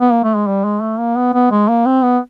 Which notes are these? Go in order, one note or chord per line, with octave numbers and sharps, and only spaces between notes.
B3
A#3
A3
G#3
G3
G#3
A3
A#3
B3
B3
G#3
A#3
C4
B3